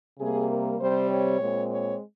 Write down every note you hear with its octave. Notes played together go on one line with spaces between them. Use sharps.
C3 G3 A#3 G#4
A#4
C3 G3 C4 C5
C#5
A#2 G#3 C4
C#5